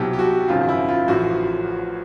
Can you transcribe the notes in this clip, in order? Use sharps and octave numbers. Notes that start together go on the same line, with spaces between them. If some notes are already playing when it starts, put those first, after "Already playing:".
Already playing: C2 B2 F#3 G4
G4
F#4
G#1 F#2 C#3 F3 F4
E4
F4
A1 A2 F3 F#4